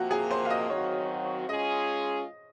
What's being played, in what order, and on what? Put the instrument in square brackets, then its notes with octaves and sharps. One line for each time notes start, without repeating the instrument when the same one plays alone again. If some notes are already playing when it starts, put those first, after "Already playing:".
Already playing: [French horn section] C3 F3 A#3 [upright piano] F#4
[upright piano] G#4
C5
F5
D#5
[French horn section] D#3 F#3 C4 F#4 [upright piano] C#5
[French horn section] G#3 C#4 F4 G#4 [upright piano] D#5